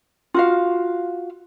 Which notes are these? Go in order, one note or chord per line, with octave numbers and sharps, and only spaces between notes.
F4 F#4 F5